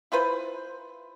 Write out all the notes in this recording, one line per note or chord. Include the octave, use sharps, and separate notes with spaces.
E4 F4 B4 C5